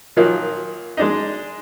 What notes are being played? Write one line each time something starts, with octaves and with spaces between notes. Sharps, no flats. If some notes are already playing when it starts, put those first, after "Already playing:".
A#2 D#3 F3 F#3 A#3
G#3 D4 D#4